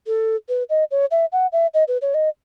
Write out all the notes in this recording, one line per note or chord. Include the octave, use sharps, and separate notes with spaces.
A4
B4
D#5
C#5
E5
F#5
E5
D#5
B4
C#5
D#5